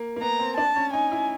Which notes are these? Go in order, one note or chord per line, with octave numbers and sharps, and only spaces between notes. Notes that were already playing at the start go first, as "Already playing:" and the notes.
Already playing: A#3
A#3
B3 A#5
C4
D4 A5
C#4
D#4 G#5
E4